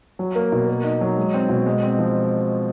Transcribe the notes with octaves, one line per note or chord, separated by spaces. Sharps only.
F#3
A#3
B2
A#3
D#4
F#3
G#3
C4
B2
G#3
C4
F3